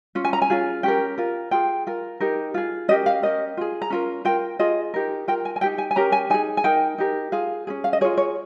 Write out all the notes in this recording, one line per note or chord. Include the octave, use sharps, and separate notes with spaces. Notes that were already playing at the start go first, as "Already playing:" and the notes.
C#4 F4
G#5
A#5
G#5
C#4 F4 G#4
C#4 G4 A#4 G5
F4 A#4
F4 G#4 G5
F4 A#4
D#4 G4 A#4
F4 G#4
C#4 G4 A#4 D#5
F5
C#4 G4 A#4 D#5
F4 G#4
A#5
C#4 F4 A#4
F4 A#4 G5
F4 G#4 D#5
D#4 G4 A#4
F4 A#4 G5
G#5
G#5
D#4 G4 A#4 G5
G#5
G#5
C#4 G4 A#4 A#5
G#5
D#4 G#4 G#5
G#5
D#4 A#4 G5
D#4 G4 A#4
F4 G#4 F5
C#4 F4 G#4
F5
D#5
F4 G#4 C#5
C#5